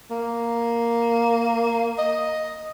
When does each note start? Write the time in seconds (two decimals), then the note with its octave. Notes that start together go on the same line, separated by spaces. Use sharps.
0.10 A#3
1.98 D#5